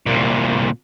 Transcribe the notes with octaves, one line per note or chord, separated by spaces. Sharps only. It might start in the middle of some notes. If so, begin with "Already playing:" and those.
C2 A#2